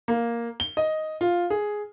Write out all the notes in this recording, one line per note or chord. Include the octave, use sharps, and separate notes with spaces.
A#3
G7
D#5
F4
G#4